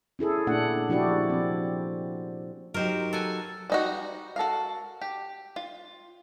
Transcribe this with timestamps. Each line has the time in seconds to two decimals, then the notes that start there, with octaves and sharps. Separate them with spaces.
0.19 C#4 E4 G#4 A4
0.47 A#2 A3 D4 F#5
0.89 F3 D4 E4 F#4 G4 D5
1.30 F3 C4
2.74 F#3 D#4 G4 A#4 C5
3.13 A4 F#5 G#5
3.70 G3 D#4 F#4
4.36 F#4 A4 A#4 F5
5.01 G4
5.56 F4